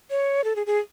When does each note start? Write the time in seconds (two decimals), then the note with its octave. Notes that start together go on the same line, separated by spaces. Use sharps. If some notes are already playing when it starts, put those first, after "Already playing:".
0.10 C#5
0.44 A4
0.56 G#4
0.67 G#4